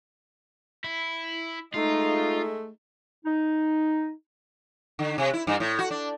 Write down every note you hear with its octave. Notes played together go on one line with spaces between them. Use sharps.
E4
G#3 A3 D#4 F4
D#4
D3
C3
E4
G2
A2
F#4
D4